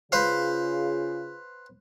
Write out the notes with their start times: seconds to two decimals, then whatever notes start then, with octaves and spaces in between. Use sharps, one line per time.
0.12 C#3 F4 G#4 B4 C5 F5